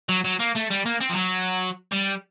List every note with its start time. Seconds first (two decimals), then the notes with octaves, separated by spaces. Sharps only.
0.09 F#3
0.24 F#3
0.39 A#3
0.55 A3
0.70 G3
0.86 A#3
1.01 C4
1.10 F3
1.16 F#3
1.92 G3